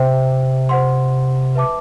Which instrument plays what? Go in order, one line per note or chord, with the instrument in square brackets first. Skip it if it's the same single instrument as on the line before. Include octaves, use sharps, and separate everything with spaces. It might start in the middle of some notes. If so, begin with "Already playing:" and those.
Already playing: [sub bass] C3 [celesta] C5 E5 G5
[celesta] C5 F#5 C6
B4 E5 A5 D6